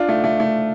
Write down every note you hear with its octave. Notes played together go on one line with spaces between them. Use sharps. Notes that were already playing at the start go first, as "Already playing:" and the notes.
Already playing: D4 F4
A3
A3
A3